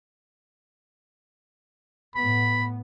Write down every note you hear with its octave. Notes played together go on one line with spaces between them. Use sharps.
A2 B3 B5